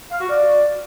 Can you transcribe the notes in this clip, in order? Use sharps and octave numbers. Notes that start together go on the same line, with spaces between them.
F5
F#4
D5